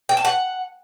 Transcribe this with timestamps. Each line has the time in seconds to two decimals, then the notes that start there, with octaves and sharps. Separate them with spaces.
0.09 G5
0.17 A5
0.25 F#5